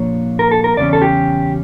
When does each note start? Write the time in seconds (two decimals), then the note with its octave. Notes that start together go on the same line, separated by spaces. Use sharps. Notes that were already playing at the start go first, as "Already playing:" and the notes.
Already playing: A#2 F3 A#3 D4 C#5
0.39 A#4
0.51 A4
0.64 A#4
0.77 E2 C#3 G3 C#4 D5
0.93 A4
1.02 G4